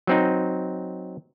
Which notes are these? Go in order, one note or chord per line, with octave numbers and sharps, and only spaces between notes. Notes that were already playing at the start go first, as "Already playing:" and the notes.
F#3 C4 D#4